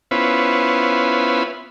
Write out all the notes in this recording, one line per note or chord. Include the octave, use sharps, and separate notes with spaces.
B3 C#4 E4 F4 B4 C5